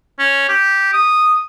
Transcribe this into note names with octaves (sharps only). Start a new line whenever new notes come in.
C#4
G4
D#6